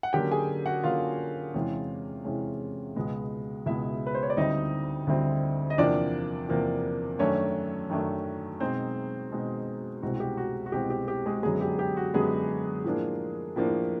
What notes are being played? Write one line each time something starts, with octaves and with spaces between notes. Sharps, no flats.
F#5
D3 F#3 A#3 C#4 G4 G5
G#4 G#5
F#4 F#5
D3 F#3 A#3 C#4 F4 F5
E2 C3 E3 G#3 C#4
E2 C3 E3 G#3 C#4
C#2 B2 G#3 B3
C#2 B2 G#3 B3 E4 E5
B4
C5
C#5
D5
D2 D3 G3 C4 D#4 E4 D#5
D2 D3 G3 C4 E4
D#5
E2 C3 F3 A#3 D4 D5
E2 C3 F3 A#3
F#2 D#3 F#3 A3 C#4 D4 C#5
F#2 D#3 F#3 A3 D4
B2 G#3 C4 D#4 C5
B2 G#3 C4 D#4
C2 B2 G#3 C4 F#4
F#4
G4
F#4
F#4
C2 B2 G#3 C4 G4
G4
G4
G#3 G#4
F#2 D3 F#3 G#3 B3 G#4
G4
G4
F#4
F#2 D3 F#3 G#3 B3 G#4
A2 F3 A#3 D4
A2 F3 A#3 D4